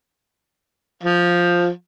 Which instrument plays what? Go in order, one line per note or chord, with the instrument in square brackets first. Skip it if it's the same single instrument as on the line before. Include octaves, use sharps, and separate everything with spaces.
[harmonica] F3